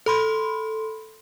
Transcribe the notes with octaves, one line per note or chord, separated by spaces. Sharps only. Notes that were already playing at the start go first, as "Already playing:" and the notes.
A4 B5 C6